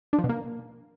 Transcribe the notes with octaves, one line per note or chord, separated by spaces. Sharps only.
D4
F3
B2
A#3